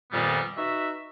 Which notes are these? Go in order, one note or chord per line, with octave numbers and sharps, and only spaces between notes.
F2 A#2 D#3 G3 A#3 B3
D#4 F#4 B4 E5